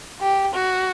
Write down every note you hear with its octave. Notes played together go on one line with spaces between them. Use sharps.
G4
F#4